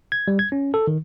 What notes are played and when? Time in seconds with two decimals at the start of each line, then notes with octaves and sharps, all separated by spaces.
0.12 G#6
0.28 G3
0.39 G#6
0.52 C#4
0.74 A4
0.87 D#3